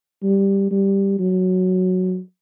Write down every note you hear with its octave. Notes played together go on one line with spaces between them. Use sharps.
G3
G3
F#3